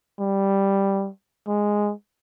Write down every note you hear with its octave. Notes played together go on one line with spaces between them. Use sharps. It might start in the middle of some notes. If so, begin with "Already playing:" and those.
G3
G#3